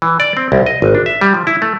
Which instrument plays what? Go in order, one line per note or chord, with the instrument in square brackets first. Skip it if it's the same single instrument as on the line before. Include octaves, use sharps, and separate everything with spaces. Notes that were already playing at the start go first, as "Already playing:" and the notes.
[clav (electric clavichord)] E3
D5
C4
C2
D#5
G#1
D4
E5
G3
F3
E4
A3